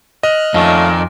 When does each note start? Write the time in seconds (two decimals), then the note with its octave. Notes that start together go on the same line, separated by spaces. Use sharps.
0.23 D#5 F6 F#6
0.54 F2 A#2 D#3 A3 C#4 F5